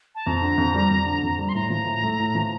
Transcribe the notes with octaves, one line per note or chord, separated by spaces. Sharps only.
A5
F2 A#5
D3
F2
G3
F2
D3
F2
G3
C6
A2 A#5
F3
A2
A3
A2
F3